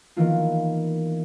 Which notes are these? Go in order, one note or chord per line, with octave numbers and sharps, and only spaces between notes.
D#3 E3 A#3 B3 E4 F4